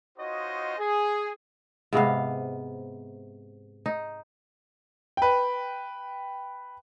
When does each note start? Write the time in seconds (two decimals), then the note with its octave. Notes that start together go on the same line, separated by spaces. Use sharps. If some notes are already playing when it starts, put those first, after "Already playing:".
0.18 D#4 F4 F#4 C5 C#5 D#5
0.77 G#4
1.93 G#2 C3 B3 F5
3.86 D#4
5.17 B4 G5